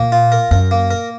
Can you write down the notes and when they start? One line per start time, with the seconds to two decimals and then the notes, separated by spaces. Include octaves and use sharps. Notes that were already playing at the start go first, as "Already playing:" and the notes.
Already playing: A#2 A#3
0.12 F4
0.32 A#4
0.51 F#2 A#4
0.71 A#3
0.91 A#4